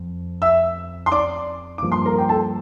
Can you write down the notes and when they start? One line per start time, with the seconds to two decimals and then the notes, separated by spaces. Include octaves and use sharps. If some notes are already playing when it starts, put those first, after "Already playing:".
Already playing: F2
0.42 E5 E6
1.06 C6
1.12 D5 D6
1.78 G2 F3 A#3 D6
1.92 C6
2.06 A#4 A#5
2.19 G5
2.29 A4 A5